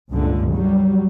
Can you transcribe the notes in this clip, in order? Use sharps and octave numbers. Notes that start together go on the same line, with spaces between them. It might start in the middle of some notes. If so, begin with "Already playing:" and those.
C#2 G2 A#2 D3
F#3 G3